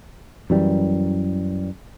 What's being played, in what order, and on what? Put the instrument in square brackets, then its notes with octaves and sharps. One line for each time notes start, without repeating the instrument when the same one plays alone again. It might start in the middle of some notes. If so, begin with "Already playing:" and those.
[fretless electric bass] F#2 E3 G3